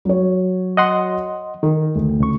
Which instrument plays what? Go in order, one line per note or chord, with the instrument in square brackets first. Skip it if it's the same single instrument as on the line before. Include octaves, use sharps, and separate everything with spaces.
[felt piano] F#3 C#5
[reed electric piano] D#5 F#5 C6
[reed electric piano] D#3 [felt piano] A#4
[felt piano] D2
[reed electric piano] C#2 C#6